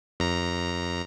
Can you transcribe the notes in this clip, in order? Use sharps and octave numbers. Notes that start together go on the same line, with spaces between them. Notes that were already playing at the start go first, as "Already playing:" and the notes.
F2 A#5